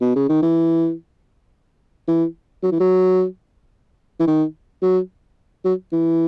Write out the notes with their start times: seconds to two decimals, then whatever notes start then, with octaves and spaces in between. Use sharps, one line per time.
0.01 B2
0.15 C#3
0.29 D#3
0.42 E3
2.08 E3
2.63 F#3
2.72 E3
2.80 F#3
4.19 E3
4.27 D#3
4.82 F#3
5.65 F#3
5.92 E3